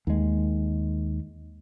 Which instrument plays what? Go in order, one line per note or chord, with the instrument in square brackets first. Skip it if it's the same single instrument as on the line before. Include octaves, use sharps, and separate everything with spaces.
[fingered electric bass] D#2 G#3